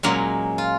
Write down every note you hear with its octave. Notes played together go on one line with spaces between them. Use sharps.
A#2 F#3 G#3 A#3 C#4
F4